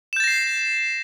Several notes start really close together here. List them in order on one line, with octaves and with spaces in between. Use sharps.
E7 G6 A6 A#6 C7